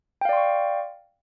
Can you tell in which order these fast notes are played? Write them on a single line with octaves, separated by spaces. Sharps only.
G5 F5 D5 C6 C#6